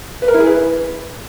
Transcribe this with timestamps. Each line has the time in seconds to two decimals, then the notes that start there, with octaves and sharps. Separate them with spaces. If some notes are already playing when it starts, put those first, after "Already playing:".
0.22 B4
0.28 A#4
0.34 E4
0.40 G#4
0.46 B4